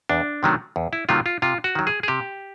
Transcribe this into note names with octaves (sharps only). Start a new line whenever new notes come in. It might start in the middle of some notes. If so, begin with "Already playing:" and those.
E2 D4
C3 D#3 F#3 A3
E2
E4
C3 D#3 F#3 A3 F4
F4
C3 F4
F#4
D#3 F#3
G#4
G#4
C3 G4